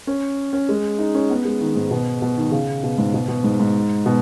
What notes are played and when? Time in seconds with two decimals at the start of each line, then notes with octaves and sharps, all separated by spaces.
0.07 C#4
0.53 C#4
0.69 G#3
0.99 D#4
1.14 C#4
1.30 B3
1.45 G#3
1.61 D#3
1.75 G#2
1.91 B2
2.22 B2
2.37 D#3
2.52 C#3
2.83 B2
2.98 G#2
3.14 B2
3.28 B2
3.44 G#2
3.60 G#2
4.06 B2